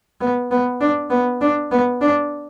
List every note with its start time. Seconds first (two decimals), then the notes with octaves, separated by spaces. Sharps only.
0.21 B3
0.51 B3
0.81 D4
1.10 B3
1.41 D4
1.71 B3
2.01 D4